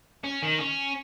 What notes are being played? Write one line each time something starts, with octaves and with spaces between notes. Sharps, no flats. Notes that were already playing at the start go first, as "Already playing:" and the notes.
C#4
D#3
C#4